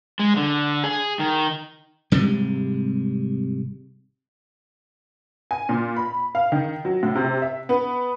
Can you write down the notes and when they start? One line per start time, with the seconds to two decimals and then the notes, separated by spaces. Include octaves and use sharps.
0.19 G#3
0.36 D3
0.84 G#4
1.19 D#3
2.12 G#1 C3 G3 G#3
5.51 G#5
5.69 A#2
5.96 B5
6.35 F5
6.52 D#3
6.85 F#3
7.03 A2
7.15 C3
7.42 E5
7.69 B3